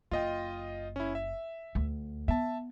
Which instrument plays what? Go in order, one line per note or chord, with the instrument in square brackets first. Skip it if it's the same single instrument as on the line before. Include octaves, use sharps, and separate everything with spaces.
[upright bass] F#1 [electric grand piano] F4 D#5 G5
[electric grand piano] C#4 E4
E5
[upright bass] D2
[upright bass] B3 [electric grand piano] E5 A5